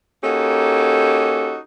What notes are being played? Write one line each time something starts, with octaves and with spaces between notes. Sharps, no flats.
A#3 C#4 D#4 F#4 G4 A4